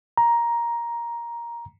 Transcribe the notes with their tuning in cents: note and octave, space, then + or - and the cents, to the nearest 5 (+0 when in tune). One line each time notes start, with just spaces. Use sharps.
A#5 +10